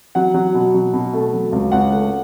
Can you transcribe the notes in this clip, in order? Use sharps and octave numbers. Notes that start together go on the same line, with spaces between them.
F#3 F#5
F#3
B2
F#3
B2
A3
F#3
C#2
C#2 F#5
A3